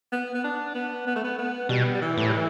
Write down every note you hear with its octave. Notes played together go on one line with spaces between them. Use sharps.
B3
B3
D4
B3
B3
A3
B3
B3
B2 G3
G3
E3
A2
G3
E3